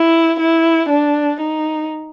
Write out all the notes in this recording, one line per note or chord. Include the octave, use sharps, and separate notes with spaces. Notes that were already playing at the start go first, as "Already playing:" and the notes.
Already playing: E4
E4
D4
D#4